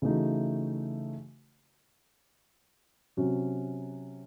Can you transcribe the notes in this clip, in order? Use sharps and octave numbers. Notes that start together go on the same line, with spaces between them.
C#3 E3 A3 D#4 F#4
C3 F#3 C#4 F#4